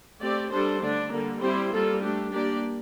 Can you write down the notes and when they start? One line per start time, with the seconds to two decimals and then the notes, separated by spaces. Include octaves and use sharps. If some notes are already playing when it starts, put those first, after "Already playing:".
0.20 A3 C4 G4 D5
0.50 G3 D4 A4 C5
0.81 D3 A3 D4
1.11 D3 G3 A#3
1.41 G3 C4 E4 G4 C5
1.71 G3 A#3 F4 A4
2.00 A3 D4 G4
2.31 A#3 D4 G4 D5